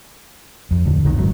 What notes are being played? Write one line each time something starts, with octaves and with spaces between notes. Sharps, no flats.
F2
D1 D3
A#1 E2 D3 D#3
F#1 G#2 D#3 F#3